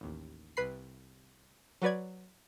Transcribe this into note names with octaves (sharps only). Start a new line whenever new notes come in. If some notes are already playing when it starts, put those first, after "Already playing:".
A1 D#2
C2 B4 B5 C7
F#3 F#4 B4 D5 G#6